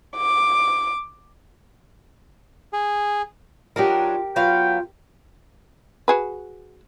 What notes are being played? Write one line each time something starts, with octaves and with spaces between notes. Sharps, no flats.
D6
G#4
F#3 D4 D#4 F4 G4 A#4
F#3 B3 F4 F5 G5
F#4 G#4 B4